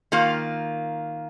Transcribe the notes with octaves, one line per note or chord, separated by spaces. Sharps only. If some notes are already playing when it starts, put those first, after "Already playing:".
D#3 A#3 F4